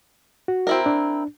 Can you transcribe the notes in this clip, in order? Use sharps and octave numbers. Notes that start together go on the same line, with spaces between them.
F#4
C4 E4 A#4
D4